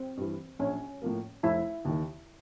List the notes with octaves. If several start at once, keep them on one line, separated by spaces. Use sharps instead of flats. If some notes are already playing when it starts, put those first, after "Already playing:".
Already playing: C4
G2 E3
A#1 C#4
A2 F3 A#3
F1 E4
D#2 D#3